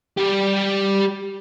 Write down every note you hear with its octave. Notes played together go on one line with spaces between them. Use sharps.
G3 G4